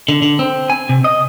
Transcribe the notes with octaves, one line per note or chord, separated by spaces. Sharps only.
D3
D3
C4
G#5
C3
D#5